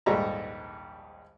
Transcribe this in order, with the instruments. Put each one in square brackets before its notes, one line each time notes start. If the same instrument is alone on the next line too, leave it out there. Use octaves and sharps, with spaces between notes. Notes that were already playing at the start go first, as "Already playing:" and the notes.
[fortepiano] A#1 D#2 G#2 G3 A4 A#5